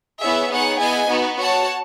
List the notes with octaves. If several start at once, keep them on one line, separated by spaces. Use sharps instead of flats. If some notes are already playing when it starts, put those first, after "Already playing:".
B3 E4 G#4 C#5 E5
B3 D#4 G#4 C#5 F#5
B3 E4 G#4 D#5 G#5
B3 D#4 F#4
F#4 C#5 F#5 A5